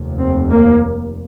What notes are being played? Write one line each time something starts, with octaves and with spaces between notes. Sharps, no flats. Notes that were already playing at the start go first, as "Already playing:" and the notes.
Already playing: F1 D#2
C4
A#3